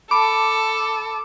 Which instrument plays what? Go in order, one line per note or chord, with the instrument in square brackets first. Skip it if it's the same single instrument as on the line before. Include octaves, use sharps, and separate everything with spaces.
[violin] A4 [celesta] A5 B5 [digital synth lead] D6